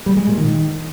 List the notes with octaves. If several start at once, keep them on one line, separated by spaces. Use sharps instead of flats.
G3
G#3
A#2
D#3